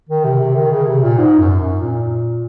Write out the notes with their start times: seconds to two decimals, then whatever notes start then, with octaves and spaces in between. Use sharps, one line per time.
0.09 D#3
0.24 C3
0.40 C3
0.56 D#3
0.71 C#3
0.86 C3
1.03 A#2
1.18 G#2
1.38 F#2
1.59 F#2
1.81 A#2